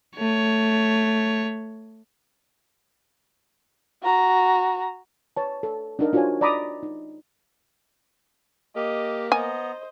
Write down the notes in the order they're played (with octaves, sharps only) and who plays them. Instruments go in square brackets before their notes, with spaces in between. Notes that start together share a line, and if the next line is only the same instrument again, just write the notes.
[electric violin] A3 C#5
[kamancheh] F#4 A#5
[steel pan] B4 C#5 A5
A4
D4 D#4 A#4
D4 F4 F#4 C5 C#5 G#5
D5 D#5 A#5 B5 D6 D#6
D#4
[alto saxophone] A#3 [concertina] G4 [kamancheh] D#5
[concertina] B3 A#5 [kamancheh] C5 D#5 [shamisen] G#5